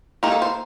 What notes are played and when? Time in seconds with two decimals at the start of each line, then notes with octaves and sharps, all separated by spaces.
0.23 D#3 A#3 D#4 G4
0.32 A4
0.42 C5